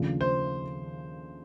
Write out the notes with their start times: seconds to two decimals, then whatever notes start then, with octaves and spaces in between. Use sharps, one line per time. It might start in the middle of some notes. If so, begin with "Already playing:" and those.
Already playing: D#2 C#3 F3 A3 D4
0.21 C5